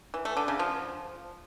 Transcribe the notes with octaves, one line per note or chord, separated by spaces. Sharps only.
E3
A3
D3
C#3
F3